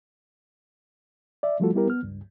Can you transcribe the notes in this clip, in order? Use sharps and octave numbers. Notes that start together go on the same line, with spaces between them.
D5 E5
F3 G3 A3 F4 F#4 A4
G3 B3 E4 G4 A#4
B3 F6
C#2 G2